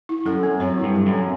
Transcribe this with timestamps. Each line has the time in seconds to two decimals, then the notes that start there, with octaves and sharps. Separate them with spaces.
0.09 E4
0.26 F#2 A4
0.43 C4
0.60 F#2 C#5
0.77 E4
0.83 G2
0.95 A4
1.06 F#2
1.13 C4